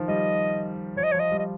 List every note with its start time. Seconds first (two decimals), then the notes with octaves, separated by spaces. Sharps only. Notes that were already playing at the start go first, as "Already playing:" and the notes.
Already playing: D#3 F3
0.08 G3 D#5
0.96 F3 C#5
1.04 D#5
1.12 C#5
1.14 F3
1.19 D#5
1.31 G3
1.39 D#5